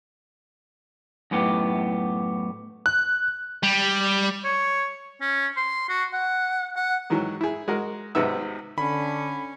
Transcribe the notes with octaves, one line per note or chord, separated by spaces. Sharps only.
F#2 A2 B3 G4
F#6
G3
C#5
C#4
C6
F#4
F#5
F#5
G#2 D#3 E3 F#3
E4 G#4
G#3 F#4 A#4
G#1 C3 B3 D#4 E5
D3 C#4 B5